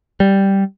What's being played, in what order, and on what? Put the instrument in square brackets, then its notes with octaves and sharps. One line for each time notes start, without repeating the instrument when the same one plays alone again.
[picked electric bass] G3